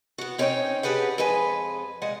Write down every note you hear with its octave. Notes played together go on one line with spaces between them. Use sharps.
B3 F#4
C4 C#4 D#4 A#4 C#5 G5
D4 G4 G#4 B4 F#5
F2 G#3 B4 G#5
A#2 G#3 F#5